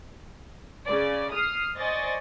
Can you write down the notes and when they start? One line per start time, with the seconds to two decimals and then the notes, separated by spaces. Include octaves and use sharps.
0.86 C#3 D5
1.32 D#6 F6 C7
1.76 C5 D5 D#5 G#5 C#6 A6